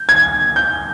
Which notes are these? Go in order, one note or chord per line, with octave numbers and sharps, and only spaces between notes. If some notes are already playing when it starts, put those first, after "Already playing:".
Already playing: G6
G#6
G6